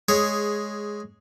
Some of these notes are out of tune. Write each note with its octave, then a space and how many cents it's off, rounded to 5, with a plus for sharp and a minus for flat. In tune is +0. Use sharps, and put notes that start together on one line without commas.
G#3 +5 G#4 -5 C#5 +0